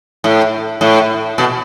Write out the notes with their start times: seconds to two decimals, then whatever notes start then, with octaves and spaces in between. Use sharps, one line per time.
0.24 A2
0.81 A2
1.38 B2